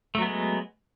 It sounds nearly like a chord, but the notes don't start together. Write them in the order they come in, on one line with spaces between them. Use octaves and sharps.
A3 F#3 B3 G#3